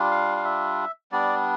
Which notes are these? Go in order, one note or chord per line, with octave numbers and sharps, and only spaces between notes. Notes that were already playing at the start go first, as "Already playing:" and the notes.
Already playing: G3 D4 F4
F5
F5
E5
G3 B3 D4 D5